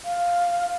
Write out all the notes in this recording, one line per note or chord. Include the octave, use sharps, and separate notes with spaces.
F5